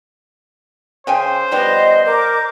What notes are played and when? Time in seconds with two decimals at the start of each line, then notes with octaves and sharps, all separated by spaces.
1.07 C#3 C5 G5 G#5
1.52 F3 G3 B3 D#5
2.05 A#4 D6 G6